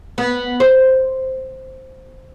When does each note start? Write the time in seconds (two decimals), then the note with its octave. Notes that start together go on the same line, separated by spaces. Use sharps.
0.18 B3
0.60 C5